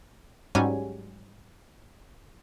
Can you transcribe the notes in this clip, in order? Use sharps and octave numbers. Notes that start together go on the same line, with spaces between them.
G#2 F#3 G3 C#4 G#5